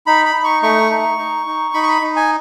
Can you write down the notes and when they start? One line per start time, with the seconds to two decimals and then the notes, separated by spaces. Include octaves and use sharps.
0.07 D#4 B5
0.25 B5
0.35 D#4
0.44 C#6
0.63 A3 C#6
0.91 D#4
1.18 D#4
1.46 D#4
1.74 D#4 B5
1.83 C#6
1.88 B5
2.02 D#4
2.16 G#5